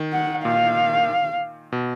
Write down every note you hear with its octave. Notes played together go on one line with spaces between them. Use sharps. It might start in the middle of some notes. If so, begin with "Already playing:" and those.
Already playing: D#3
F#5
A#2 F5
B2